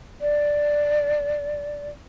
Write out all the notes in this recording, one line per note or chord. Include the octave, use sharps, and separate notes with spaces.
D5